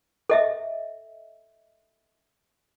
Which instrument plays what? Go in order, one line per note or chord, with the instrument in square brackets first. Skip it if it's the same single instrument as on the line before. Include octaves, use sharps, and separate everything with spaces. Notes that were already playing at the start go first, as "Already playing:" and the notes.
[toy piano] A4 D#5 E5